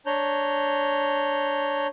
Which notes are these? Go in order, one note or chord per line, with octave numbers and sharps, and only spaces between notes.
D4 C#5 A#5 G6